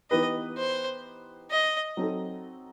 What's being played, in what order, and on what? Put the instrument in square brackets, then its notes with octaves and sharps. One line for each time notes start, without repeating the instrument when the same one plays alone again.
[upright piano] E3 B3 D#4 G4 B4 [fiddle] D#5
[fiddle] C5
D#5
[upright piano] F#3 C4 D#4 A4